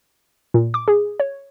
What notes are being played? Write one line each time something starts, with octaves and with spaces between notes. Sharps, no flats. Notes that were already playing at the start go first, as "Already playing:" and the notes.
A#2
D6
G#4
C#5